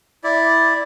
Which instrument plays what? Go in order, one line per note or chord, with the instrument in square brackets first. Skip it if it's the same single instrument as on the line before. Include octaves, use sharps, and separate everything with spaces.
[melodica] E4 D5